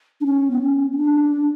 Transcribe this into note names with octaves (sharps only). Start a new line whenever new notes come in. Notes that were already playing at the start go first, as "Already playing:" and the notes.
D4
C#4
B3
C#4
C#4
D4